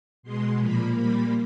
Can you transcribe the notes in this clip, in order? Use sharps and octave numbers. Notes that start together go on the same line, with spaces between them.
B2 G#3 C6
A#2 F3 A#3 B5
A#2 G3 A#3 B5